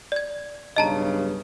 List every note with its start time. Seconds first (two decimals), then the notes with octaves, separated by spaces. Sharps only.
0.12 D5 G#6
0.76 B1 G2 C#3 D#5 A5 A#5